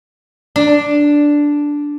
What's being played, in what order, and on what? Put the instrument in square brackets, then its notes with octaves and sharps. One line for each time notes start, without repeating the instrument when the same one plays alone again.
[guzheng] D4